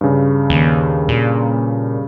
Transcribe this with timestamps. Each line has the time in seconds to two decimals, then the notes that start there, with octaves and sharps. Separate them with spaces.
0.01 G2 C#3
0.50 D#2
1.09 A#2